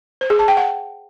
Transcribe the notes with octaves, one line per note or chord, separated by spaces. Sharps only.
C5
G#4
A5
G5
F#5